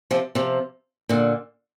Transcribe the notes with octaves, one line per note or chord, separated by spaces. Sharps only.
C3 F3
C3 F3
A#2 D3